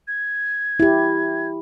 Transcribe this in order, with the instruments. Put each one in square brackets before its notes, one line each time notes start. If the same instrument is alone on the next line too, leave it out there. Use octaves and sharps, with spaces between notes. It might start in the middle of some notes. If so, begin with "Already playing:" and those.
[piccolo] G#6
[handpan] E4 G4